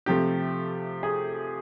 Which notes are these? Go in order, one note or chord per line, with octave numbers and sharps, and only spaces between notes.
C3 F3 A3 G4
G#4